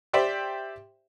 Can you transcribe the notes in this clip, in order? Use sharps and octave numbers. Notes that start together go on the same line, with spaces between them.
G4 C5 D5 E5 G5